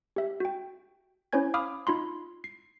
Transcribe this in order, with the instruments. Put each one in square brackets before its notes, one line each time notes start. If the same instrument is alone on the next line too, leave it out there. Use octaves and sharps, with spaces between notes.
[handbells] G4 E5
F#4 G5
C#4 E4 C5 C#5 G#5 G#6
F5 B5 D6 D#6 F6
D#4 F4 B5 C6
C7